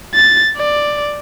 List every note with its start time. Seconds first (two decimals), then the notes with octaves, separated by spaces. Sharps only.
0.14 A6
0.57 D5